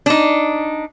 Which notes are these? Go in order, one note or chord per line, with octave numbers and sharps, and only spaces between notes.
D4 D#4